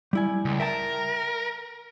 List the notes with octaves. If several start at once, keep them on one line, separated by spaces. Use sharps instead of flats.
G3 E4 G#5
C#2
A#4 E5 G5 A5